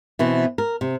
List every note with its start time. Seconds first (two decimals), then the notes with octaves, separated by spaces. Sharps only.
0.19 B2 E3 C4
0.58 A#4
0.81 C3